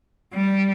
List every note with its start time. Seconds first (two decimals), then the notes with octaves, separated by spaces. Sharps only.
0.33 G3